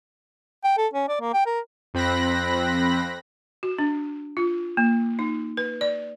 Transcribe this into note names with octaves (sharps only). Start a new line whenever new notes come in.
G5
A4
C#4
D5
A#3
G5
A#4
F2 C4 B5 F#6 A#6
F#4
D4
F4
A#3
D#4
B4
D5